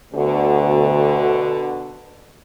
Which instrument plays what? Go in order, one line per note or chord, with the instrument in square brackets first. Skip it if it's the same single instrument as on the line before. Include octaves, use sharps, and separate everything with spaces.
[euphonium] D2 [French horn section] B2 D3 F#4